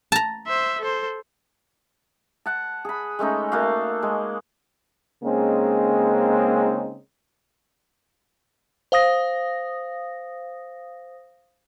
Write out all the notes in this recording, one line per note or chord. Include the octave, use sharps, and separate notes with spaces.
A5 A#5
C5 E5
A4 C5
F#5 A5
G#4 B5
G#3 A3 C#4 D#4
A3 A#3 F#4 F5
G#3
C#3 G#3 A#3 C4 C#4 D#4
C5 F5 D#6 A#6